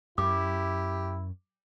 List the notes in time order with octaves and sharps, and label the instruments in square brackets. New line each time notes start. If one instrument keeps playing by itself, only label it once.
[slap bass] F#2 [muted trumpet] E4 [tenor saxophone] G4 [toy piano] D6